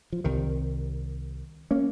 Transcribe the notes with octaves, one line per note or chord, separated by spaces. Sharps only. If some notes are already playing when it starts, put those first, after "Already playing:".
F3
C2 C3 D#3
A#3 C#4